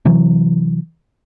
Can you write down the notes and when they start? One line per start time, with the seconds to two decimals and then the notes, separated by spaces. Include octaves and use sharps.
0.05 C3 E3 F#3